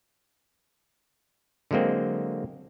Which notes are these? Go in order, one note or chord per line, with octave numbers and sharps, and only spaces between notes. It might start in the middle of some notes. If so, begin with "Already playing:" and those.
D3 F#3 G#3 A#3 C4